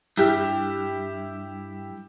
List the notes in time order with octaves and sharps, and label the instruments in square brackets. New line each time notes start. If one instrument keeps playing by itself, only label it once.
[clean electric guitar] G2 [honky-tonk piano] E4 G4